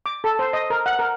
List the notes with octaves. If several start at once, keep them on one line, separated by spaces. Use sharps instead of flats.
D6
A4
C5
D#5
A#4
F#5
A#4